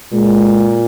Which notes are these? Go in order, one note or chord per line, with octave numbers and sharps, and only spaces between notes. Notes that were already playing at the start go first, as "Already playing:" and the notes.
A#2 G#3